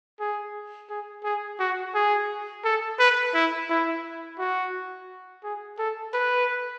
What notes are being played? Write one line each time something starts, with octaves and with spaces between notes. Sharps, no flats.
G#4
G#4
G#4
F#4
G#4
A4
B4
E4
E4
F#4
G#4
A4
B4